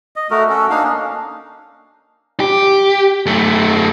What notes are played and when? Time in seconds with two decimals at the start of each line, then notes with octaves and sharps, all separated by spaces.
0.16 D#5
0.31 A3 F#4 A#4
0.49 C#4 F#4 A4
0.70 A#3 D4 D#4 F5
0.83 C#4 D4
2.40 G4
3.26 F#2 A3